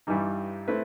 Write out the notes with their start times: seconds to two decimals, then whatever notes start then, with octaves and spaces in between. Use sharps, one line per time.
0.07 G2 E3 G3 D#4
0.68 A3 C4 E4 B4